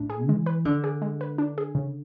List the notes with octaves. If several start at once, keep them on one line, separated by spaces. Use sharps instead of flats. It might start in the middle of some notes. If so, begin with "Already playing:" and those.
Already playing: A2 D4
G#4
E3 G#3
B4
D3 D4
G#4
G#3
B4
D4
G#4
C#3